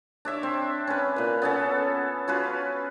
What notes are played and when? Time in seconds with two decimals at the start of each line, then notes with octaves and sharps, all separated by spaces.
0.25 D4 C#5 E5 D6
0.43 C4
0.87 C#4 B4
1.16 A#2 B4
1.42 B3 C#4 A4
2.28 C#4 F4 F#4 B4